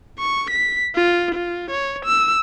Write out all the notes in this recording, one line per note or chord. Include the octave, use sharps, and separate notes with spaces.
C#6
B6
F4
F4
C#5
E6